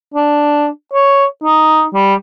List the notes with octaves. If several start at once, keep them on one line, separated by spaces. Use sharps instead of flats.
D4
C#5
D#4
G3